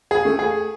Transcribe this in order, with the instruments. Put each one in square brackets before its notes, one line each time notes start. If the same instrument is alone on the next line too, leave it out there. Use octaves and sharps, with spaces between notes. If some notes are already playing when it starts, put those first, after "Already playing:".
[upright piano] G#4
A3
G#4